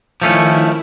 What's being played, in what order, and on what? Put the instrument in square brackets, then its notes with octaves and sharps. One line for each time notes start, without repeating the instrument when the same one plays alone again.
[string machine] D#3 E4 [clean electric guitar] F3 A3 C#4